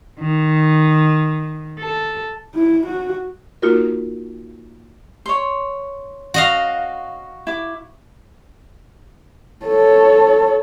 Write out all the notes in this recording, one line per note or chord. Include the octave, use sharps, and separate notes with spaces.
D#3
A4
E4
F#4
A#3 D#4 F4 F#4 A#4
C#5 C6
F#4 D#5 F5
E4 D6
A4 C#5